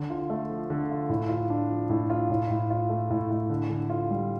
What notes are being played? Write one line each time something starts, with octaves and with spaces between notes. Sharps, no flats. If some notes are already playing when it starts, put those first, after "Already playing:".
Already playing: D3
F4
A3
F3
D3
F4
A2
F4
D4
F3
A2
F4
A2
A2
F4
A3
A2
A2
D3
D3
F4
G3